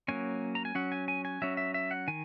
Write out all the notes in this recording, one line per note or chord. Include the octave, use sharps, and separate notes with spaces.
F#3 A#3 C#4 G#5
A#5
G#5
F#3 C#4 F#5
G#5
G#5
G#5
F#3 C#4 E5
E5
E5
F#5
D#3 G#5